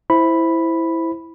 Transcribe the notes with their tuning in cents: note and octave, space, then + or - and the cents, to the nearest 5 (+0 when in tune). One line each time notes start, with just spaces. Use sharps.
E4 +0 C5 +0 B5 +0